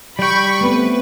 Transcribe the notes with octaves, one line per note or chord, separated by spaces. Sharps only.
G3 G5 B5 C#6
A3 B3 C4 B4